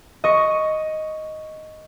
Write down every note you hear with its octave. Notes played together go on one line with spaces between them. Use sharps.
D#5 C#6